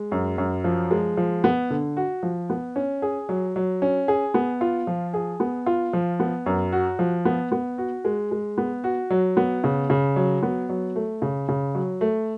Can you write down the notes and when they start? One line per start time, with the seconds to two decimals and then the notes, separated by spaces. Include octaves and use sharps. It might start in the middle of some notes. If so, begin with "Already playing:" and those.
Already playing: G#3
0.12 F#2
0.38 F#2
0.64 F3
0.91 G#3
1.17 F3
1.44 B3
1.70 D3
1.97 F#4
2.23 F3
2.50 B3
2.76 C#4
3.02 G#4
3.29 F#3
3.56 F#3
3.82 C#4
4.08 G#4
4.34 B3
4.61 F4
4.87 F3
5.14 G#4
5.40 B3
5.66 F4
5.93 F3
6.20 B3
6.46 F#2
6.72 F#4
6.99 F3
7.25 B3
7.52 B3
7.78 F#4
8.05 G#3
8.31 G#3
8.58 B3
8.84 F#4
9.10 F#3
9.37 B3
9.64 C#3
9.90 C#3
10.16 F#3
10.43 B3
10.69 F#3
10.96 A3
11.22 C#3
11.48 C#3
11.75 F#3
12.01 A3